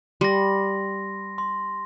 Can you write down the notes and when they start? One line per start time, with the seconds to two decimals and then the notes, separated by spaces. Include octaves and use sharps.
0.21 G3 C6 A#6
1.38 C6